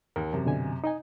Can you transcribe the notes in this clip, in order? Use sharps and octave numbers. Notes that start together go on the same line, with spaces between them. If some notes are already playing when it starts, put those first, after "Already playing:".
D#2 A#4
F#2 C3
B2 D3 G#5
D#4 D#5 G#5